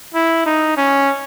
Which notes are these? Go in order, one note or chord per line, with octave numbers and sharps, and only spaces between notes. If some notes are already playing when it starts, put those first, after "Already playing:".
E4
D#4
C#4